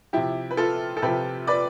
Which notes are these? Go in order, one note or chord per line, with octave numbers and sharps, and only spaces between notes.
C3 F3 E4 G4
B4
F4 A4
A4
C3 F3 G4 B4
B4 D5